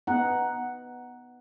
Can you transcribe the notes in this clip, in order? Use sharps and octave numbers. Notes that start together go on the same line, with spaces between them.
B3 D#4 F#5